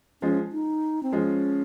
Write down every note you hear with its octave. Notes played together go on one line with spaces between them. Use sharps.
F3 G#3 C#4
D#4
C4
F3 G#3 C#4